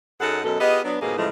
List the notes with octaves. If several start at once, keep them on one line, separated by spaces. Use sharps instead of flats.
F#2 D#4 G#4 A4 F#5
F#2 B2 A4
B3 F4 G4 G#4 D#5
F#3 B3 D4
F2 G#2 B2 A#3 B3 G#4
A2 C#3 E3 F3 G#3 A3